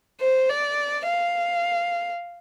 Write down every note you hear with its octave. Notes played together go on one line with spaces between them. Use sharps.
C5
D5
F5